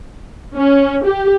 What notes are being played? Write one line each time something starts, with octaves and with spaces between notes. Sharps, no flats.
C#4
G4